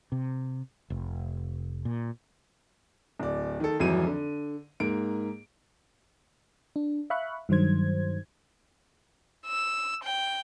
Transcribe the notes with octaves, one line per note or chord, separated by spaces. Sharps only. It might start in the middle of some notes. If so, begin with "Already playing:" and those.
C3
F1
A#2
D1 D5
D#3 A4
G#1 F2 E3 F#3 D#7
D3
G#2 A#3 D7
D4
E5 F5 B5 C#6 F#6
G2 D#3 F#3 C5 G#6
E6
G5